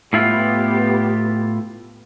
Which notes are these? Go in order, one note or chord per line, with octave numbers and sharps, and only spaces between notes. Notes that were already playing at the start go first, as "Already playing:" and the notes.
A2 B3 E4 F4 G4